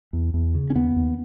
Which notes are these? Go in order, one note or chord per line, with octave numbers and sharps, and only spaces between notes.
E2
E2
C#3
C#4
D#2 B3
D#2